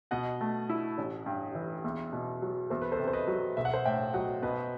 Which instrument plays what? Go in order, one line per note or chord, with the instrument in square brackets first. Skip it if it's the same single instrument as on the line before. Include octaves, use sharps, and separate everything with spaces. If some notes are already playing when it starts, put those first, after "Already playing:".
[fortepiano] B2 [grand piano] D#5 F#5
[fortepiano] A3
E4
A1
G2
E3
E2
B2
F#3
[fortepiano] E2 [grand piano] C5
[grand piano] B4
A4 C5
[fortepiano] C3
[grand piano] C5
B4 D#5
[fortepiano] F#3
[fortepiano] B1 [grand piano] E5
[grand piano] F#5
C5 E5
[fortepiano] A2 [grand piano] E5 G5
[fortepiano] F#3 [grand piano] D#5 F#5
[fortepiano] B2 [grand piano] B4 D#5